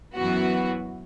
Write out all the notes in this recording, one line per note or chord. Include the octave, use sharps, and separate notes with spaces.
F#2 E3 B3 F#4